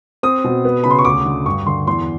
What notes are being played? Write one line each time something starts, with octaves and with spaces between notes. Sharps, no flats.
C4 D#6
B2
B3
C#3 B5
C6
C#6
D2 D6
D3
G2 C#6
D3 C6
E2 C6